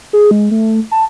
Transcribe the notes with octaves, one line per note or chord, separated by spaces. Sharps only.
G#4
G#3
A3
A5